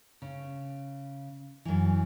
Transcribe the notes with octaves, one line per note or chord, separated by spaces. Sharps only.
C#3
F#2 E3